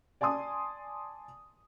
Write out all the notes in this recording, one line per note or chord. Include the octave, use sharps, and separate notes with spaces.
D5 G#5 A5 C6 D#6